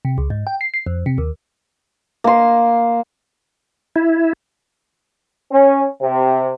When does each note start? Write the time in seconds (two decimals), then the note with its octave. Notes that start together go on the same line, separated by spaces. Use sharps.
0.05 C3
0.18 C#2
0.30 G#2
0.47 G5
0.61 C7
0.74 C7
0.86 F2
1.06 C3
1.18 D#2
2.24 A#3 C6
3.96 E4
5.51 C#4
6.01 C3